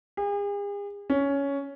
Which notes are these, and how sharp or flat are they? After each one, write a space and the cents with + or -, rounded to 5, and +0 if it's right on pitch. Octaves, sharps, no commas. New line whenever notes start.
G#4 -45
C#4 +10